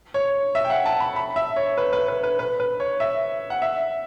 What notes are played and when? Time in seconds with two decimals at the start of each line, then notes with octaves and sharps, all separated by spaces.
0.14 C#5
0.55 E5
0.65 G5
0.70 F#5
0.86 A5
1.00 B5
1.16 B5
1.36 E5
1.56 C#5
1.77 B4
1.93 B4
2.08 B4
2.24 B4
2.39 B4
2.60 B4
2.80 C#5
3.00 E5
3.50 F#5
3.62 E5